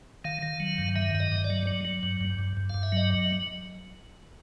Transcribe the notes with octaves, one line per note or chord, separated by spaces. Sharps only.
D#3 F5
D#3
F#3
G2
D#3 E5
G2 E5
D#5
G2
D5
F#3
F#3
F#3
G2
G2
G2
G2
G2 F5
E5
F#3 D#5